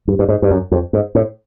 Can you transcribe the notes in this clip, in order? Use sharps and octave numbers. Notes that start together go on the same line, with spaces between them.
G2
G2
G#2
G2
F#2
F2
G#2
A2